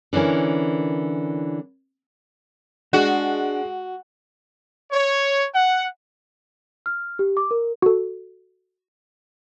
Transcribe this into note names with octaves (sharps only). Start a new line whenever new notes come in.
D3 E3 C#4 E4 A#4
G#3 D4 F#4
C#5
F#5
F6
G4
D6
A#4
F#4 A4